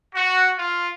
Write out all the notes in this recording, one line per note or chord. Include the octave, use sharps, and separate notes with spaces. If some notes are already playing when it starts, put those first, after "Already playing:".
F#4
F4